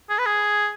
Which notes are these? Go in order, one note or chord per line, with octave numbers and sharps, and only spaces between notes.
G#4
B4
G#4